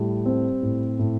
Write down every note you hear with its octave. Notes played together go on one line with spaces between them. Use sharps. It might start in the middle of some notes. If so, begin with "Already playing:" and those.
Already playing: A2 G3
C4
A2
A2